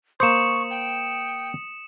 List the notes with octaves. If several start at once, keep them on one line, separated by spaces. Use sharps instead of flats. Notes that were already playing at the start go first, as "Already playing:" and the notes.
A#3 C5 C#6 D#6 C#7 E7
G5